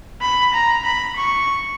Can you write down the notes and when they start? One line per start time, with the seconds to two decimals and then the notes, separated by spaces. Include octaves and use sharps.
0.21 B5
0.53 A#5
0.84 B5
1.16 C#6